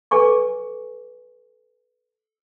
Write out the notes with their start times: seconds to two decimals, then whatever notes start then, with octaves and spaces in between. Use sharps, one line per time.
0.11 A4 B4 G#5 C#6 D6